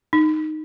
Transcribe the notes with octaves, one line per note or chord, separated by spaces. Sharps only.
D#4